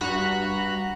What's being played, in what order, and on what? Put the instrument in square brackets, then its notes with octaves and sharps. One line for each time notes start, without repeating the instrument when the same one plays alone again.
[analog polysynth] G2 F#4 A#5 B5 F#6 A#6